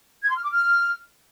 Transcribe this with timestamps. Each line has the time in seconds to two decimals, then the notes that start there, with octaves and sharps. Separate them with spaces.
0.22 G#6
0.29 C6
0.37 F6
0.44 D6
0.51 F6